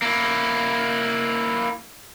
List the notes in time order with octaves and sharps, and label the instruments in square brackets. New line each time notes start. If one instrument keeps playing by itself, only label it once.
[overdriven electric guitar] A#3 E4